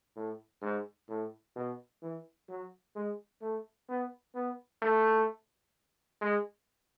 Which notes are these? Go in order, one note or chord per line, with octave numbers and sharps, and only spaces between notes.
A2
G#2
A2
B2
E3
F#3
G#3
A3
B3
B3
A3
G#3